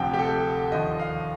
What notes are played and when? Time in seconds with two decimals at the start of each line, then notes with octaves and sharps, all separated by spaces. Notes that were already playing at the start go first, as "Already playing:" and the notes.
Already playing: D2 C3 F3 G5
0.14 G4
0.19 A4
0.72 D#2 D3 F3 D#5
0.99 F5